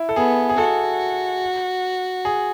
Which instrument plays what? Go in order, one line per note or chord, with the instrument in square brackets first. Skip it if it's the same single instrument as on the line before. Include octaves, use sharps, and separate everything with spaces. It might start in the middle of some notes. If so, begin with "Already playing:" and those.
Already playing: [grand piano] E4
A4
[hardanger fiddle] B3 [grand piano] G#4
[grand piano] G#4
[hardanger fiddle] F#4 [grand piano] A4
[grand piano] G#4